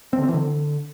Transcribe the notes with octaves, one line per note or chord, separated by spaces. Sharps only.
C4
D3
C4
E3
D3